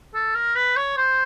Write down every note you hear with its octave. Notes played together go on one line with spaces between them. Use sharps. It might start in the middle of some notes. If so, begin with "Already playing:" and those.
A4
A#4
B4
C#5
C5